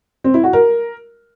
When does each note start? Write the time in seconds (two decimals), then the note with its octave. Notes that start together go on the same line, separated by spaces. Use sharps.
0.24 C4
0.34 E4
0.44 F#4
0.53 A#4